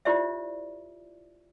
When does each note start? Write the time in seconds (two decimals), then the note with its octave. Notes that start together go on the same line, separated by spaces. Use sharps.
0.05 E4 F4 G4 C5 D5 E5